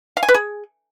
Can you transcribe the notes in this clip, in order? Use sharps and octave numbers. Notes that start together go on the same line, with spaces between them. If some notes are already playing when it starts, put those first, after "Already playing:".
F5
G#5
B4
G#4